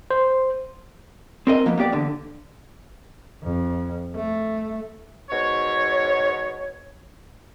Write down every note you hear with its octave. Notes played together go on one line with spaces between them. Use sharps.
C5
C4 A#4 D#5
F3 A#3 B3
A#3 B3 G4 D5
E2 D3
F2
A3
G#2 B2 C#5